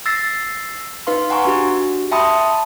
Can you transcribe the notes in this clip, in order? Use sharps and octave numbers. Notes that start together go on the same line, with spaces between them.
E6 A6 A#6 C7
D#4 B4 F5 C6
F#5 G#5 A#5 C6 C#6
D4 F#4 G4
E5 G5 A5 B5 C6 D#6
A5